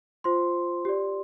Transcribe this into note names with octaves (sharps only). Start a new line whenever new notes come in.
F4 C5 C6
G4 D5